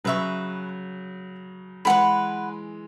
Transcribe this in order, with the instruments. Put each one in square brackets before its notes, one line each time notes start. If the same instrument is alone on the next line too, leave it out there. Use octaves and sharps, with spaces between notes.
[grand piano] C#3 F#3 [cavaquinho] B4 E5 C#6
[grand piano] E3 G#3 [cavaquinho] B4 F#5 B5